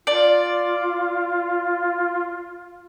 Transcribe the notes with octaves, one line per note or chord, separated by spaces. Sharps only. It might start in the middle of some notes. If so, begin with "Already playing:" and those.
F4 D5